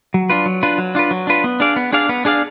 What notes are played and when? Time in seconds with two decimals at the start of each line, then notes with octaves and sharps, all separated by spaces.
0.14 F#3
0.30 D4 F4 B4
0.46 F#3
0.63 D4 F4 B4
0.78 F#3
0.95 D4 F4 B4
1.11 F#3
1.27 D4 F4 B4
1.44 B3
1.60 D4 G#4 D5 F5
1.76 B3
1.93 D4 G#4 D5 F5
2.09 B3
2.25 D4 G#4 D5 F5